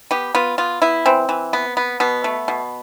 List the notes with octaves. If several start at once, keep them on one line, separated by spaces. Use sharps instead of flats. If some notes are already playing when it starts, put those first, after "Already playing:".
B3 G4
B3 F4
B3 F4
B3 E4
E3 C4
E3
B3
B3
B2 B3
A3
B2